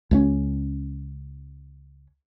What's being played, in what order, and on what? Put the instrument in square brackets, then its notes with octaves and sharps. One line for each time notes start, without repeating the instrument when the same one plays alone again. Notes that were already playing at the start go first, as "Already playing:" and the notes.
[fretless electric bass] C#2 G#3 C#4